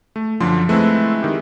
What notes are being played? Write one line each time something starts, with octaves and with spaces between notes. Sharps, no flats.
A3
F#2 D3 F3 C6
G#3 A3 C4 E4 B4
D#3 G4